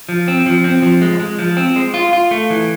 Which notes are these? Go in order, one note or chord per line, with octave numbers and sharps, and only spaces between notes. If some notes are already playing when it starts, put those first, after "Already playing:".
F3
C4
F3
C4
F3
G#3
G#3
F3
C4
G#3
F4
F4
A3
E3